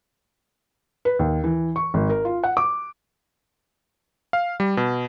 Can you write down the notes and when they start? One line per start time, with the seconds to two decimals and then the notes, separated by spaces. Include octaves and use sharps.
1.05 B4
1.19 D#2
1.44 E3
1.76 C#6
1.94 G#1
2.10 A#4
2.25 F4
2.44 F#5
2.57 D6
4.33 F5
4.60 G3
4.77 B2